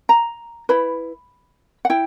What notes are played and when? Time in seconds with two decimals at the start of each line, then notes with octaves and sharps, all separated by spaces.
0.09 A#5
0.69 E4 B4 B5
1.85 F#5
1.90 E4 G5